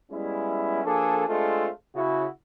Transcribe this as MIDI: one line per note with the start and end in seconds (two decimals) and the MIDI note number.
0.11 0.82 55
0.11 0.82 56
0.11 0.82 59
0.11 0.82 61
0.11 0.82 64
0.84 1.26 53
0.84 1.26 58
0.84 1.26 62
0.84 1.26 68
0.84 1.26 69
1.28 1.69 56
1.28 1.69 57
1.28 1.69 60
1.28 1.69 62
1.28 1.69 65
1.28 1.69 69
1.95 2.25 49
1.95 2.25 64
1.95 2.25 66